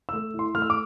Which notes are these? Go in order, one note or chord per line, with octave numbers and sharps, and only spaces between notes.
A3 E6
E4
C6
A3 F6
E6
D6